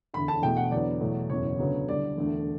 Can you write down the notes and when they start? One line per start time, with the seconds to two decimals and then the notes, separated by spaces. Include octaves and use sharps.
0.14 E1 D2 D3 B5
0.28 A5
0.42 E2 B2 A3 G5
0.57 F#5
0.71 E2 D3 F#3 B3 D5
1.01 E2 B2 F#3 A3
1.30 F#1 E2 B2 C#5
1.59 D2 C#3 F#3 B3
1.88 D2 D3 G3 D5
2.17 E1 D2 D3 A3